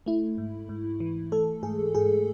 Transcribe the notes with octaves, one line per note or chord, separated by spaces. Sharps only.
A3 E4
G#2
G#2
E3
A3 A4
G#2 G#4
G#2 G#4